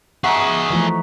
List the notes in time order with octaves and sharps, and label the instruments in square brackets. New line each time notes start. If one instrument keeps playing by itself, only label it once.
[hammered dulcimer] D#4 F#4 A#5 [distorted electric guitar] G#4 E5 [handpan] F#5 [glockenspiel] C#6 B6
[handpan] E3 F3 A3